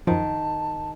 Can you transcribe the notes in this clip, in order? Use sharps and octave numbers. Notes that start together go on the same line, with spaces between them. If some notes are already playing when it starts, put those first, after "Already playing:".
F#2 D#3 F3 A5